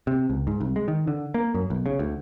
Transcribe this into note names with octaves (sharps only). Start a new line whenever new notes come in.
C3
C#2
G#2
C2
G#3
D#3
D3
A#3
F#2
B1
C#3
D2